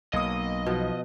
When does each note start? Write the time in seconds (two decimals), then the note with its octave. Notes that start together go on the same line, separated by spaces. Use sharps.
0.13 B1 A#3 D#5 D#6
0.66 B2 F3